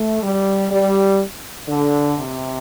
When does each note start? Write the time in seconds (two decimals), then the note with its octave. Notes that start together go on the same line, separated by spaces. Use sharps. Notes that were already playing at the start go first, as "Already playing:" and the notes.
Already playing: A3
0.23 G3
0.71 G3
1.68 D3
2.18 C3